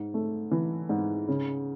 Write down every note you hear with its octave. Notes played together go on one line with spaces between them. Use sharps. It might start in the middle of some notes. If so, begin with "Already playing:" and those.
Already playing: G#2
A3
E3
G#2
C#3